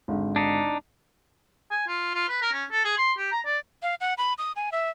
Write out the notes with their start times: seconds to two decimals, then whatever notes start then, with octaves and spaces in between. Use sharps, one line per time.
0.08 G#1 D3 G#3
0.36 D4 D#4
1.71 G#5
1.88 F4
2.14 F4
2.29 B4
2.42 A#4
2.53 C#4
2.71 A4
2.85 G#4
2.98 C6
3.18 G4
3.32 A#5
3.45 D5
3.83 F5
4.01 F#5
4.18 B5
4.38 D#6
4.56 G#5
4.72 E5